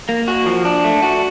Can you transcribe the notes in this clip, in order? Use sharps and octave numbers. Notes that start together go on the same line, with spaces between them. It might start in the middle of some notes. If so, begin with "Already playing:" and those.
A#3
F#4
F3
D4
A3
F#4